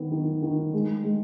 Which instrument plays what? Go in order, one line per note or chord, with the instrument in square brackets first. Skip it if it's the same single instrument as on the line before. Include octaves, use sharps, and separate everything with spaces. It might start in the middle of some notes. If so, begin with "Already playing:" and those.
Already playing: [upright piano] D#3 B3
D#3
D#3
G#3
G#3